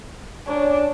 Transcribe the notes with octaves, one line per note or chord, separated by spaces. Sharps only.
C#4 D4 A#4 C#5